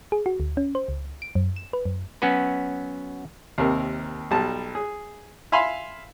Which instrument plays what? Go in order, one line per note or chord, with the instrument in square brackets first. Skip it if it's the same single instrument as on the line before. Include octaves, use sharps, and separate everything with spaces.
[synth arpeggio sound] G#4
F#4
D2
C#4
C5
C#2
D7
F#2
E7
B4
F#2
[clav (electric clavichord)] F#3 B3 C#4 F#4 B4
[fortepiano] D#2 C3 A#4
B1 G3 A5
G#4
E5 F5 G#5 B5 C6